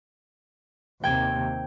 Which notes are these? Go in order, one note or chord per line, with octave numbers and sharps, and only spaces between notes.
D#2 C3 G5 G#6